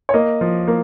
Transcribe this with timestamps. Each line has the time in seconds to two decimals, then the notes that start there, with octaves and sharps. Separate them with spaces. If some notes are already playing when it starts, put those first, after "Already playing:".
0.09 C#5
0.14 A#3 D#5
0.41 F3
0.68 A#3